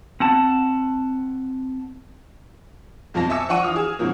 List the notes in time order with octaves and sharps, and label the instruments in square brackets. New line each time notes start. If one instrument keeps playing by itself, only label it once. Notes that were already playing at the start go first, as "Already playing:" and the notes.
[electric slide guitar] C4 F#5 A5
[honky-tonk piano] B1 F2 F4 A5 A#6
E5 G#5 A5 D6 E6 C#7
F3 D4 F#5 C#6 D#7
E3 F4 D#6 F6
G#4 E7
G#2 C3 D#3 F#3 A#3